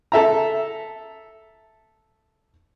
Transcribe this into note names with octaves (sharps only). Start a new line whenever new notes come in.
A4 E5 A#5